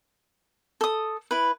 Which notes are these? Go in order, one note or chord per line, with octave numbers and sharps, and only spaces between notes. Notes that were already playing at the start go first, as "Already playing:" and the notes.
A4 D#6
E4 B4